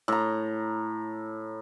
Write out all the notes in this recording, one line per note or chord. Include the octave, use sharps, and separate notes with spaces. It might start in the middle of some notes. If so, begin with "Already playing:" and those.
A2 A#5